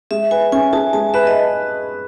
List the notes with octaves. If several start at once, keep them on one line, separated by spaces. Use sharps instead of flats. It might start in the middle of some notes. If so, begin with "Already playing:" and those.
G#3 E5
B4 G#5
C#4 G#5
G#4 A5
G#3 A5
B4 E5
D#5